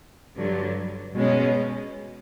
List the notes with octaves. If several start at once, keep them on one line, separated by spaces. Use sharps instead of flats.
G2 D3 F#3
B2 G#3 C#4